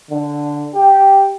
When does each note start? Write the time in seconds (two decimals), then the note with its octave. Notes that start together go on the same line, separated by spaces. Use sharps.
0.11 D3
0.75 G4